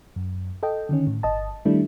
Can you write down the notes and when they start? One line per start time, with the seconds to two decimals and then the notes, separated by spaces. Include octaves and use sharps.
0.16 F#2
0.63 A4 D#5 G5
0.89 D3 D#3 C#4
1.07 A2
1.23 G1 D#5 A5
1.65 D#3 G3 A3 D4 E4